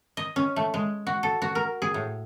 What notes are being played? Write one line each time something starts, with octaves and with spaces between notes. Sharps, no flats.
D#5
C#4
A3
G#3
F#4
A4
F#4
A#4
G#4
A2